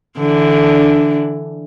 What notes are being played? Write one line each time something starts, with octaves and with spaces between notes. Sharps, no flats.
D3 E3 D4